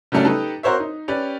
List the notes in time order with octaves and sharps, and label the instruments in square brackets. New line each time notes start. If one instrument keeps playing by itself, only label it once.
[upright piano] C#3 F#3 G3 A3 C#4 D4
D#4 G4 A4 B4
C4 F#4 A#4 C5 C#5 E5
D#4
C#4 G4 B4 D5